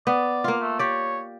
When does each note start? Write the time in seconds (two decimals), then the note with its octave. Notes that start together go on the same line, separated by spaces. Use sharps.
0.07 B3 D5
0.44 A#3 F4
0.61 A3
0.79 G4 C#5 D5